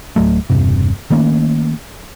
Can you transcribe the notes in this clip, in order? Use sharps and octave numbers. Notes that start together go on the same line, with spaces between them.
D1 F#3 A3
E1 G2 C3
D#3 A3 A#3 C#4